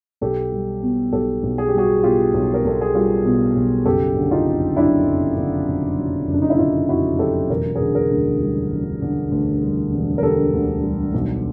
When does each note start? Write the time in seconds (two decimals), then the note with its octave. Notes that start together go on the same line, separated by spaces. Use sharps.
0.21 B1 G4 A4
0.52 G3
0.82 B2
1.12 B1 G4 A4
1.43 B1
1.58 G#4
1.68 G4
1.74 G3 F#4 G#4
2.03 B2 F4 G4
2.34 B1
2.54 A#4
2.64 B1 A4
2.81 G#4
2.95 G3 F4 G4
3.25 B2
3.56 B1
3.86 F#1 G4 A4
4.16 D3
4.31 D#4 F4
4.46 F2
4.76 F#3 D4 E4
5.07 F#1
5.37 D3
5.67 F2
5.98 F#3
6.28 F#1
6.33 D4
6.42 D#4
6.50 E4
6.58 D3 D#4 F4
6.89 F2 E4 F#4
7.19 F#3 G4 A4
7.50 E1 A#4
7.76 G#4 A#4
7.80 D3
7.95 G#4 A#4
8.10 D2
8.41 G3
8.71 E1
9.01 D3
9.31 D2
9.62 G3
9.92 E1
10.18 A#4
10.23 D3 G4 A4
10.53 D2
10.83 G3
11.14 B1